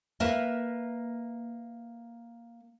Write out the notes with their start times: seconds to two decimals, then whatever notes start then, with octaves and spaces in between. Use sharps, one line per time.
0.20 A#3 A#4 B4 E5